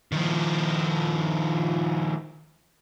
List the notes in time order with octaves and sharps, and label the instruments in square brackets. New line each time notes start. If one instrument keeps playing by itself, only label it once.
[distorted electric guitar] D#3 F3